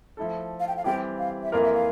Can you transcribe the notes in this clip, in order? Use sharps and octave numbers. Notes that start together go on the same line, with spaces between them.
F3 A3 E4 A4
F5
G5
F5
E3 G3 C4 G4 G5
F5
E5
F2 E3 A#3 F4 A#4 F5
E5
F5